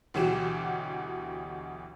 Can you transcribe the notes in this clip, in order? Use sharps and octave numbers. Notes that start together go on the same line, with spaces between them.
D2 B2 E3 F#3 G4 E7